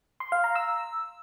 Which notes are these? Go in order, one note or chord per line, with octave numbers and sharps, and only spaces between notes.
C6
F5
A#5
E6